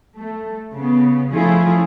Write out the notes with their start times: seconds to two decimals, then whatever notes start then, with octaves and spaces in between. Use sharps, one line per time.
0.18 A3
0.73 C#3 B3
1.33 F3 A3 C#4 E4 F4 G#4